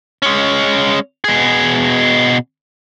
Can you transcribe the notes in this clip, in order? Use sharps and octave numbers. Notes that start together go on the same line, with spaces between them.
G#3 C#4
B2 G#4